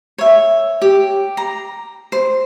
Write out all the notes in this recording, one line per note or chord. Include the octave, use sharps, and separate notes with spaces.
C#5 E5
G4
A#5
C5